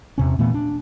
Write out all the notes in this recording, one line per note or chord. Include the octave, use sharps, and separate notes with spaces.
E2 C3 C#4
A#2 E3 A3 B3
D4